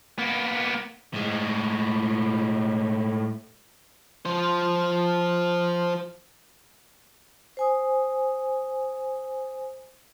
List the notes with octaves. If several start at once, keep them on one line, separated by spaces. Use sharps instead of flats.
A#3 B3
A2 G#3
F3 C5
C5 G#5 D#6